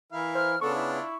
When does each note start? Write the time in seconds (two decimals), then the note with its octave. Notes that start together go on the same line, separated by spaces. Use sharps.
0.12 E3 E4 A#4 E5 F5
0.35 C5 F6
0.61 C#3 B3 D4 F4 A4 C#6
0.74 E4